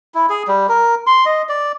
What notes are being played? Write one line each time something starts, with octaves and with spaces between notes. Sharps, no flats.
E4
G#4
G3
A#4
C6
D#5
D5